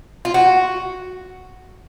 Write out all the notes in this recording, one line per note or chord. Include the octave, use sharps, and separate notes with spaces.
F4
F#4